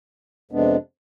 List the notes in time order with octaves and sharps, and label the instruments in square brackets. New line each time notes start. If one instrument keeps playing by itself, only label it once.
[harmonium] F2 C3 G#3 B3 D4